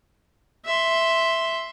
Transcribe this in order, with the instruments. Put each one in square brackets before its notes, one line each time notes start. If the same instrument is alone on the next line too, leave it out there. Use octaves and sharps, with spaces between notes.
[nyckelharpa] E5 C6